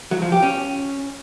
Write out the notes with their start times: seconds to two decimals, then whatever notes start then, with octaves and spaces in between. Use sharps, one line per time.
0.11 F#3
0.22 F3
0.32 G4
0.42 C#4